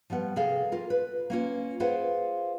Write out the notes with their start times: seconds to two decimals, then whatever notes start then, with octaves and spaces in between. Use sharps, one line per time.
0.10 F3 G3 B3 F#5
0.36 C3 G#4 A4 F5
0.72 F4 A#4
0.90 B4
1.30 A#3 C#4 F4
1.80 F4 G#4 B4 C5 F5 F#5